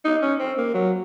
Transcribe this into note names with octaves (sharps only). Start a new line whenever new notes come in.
D#4
C#4
C4
A#3
F#3